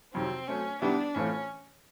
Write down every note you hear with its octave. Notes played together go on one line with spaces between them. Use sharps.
F2 C3 D#3 F#3 C4
F#3 A3 C4 C#4
D#3 G3 B3 D4 E4 G4
A2 E3 A3 C4 C#4 F4